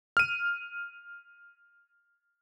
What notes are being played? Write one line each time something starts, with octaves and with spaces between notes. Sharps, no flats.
F6 D#7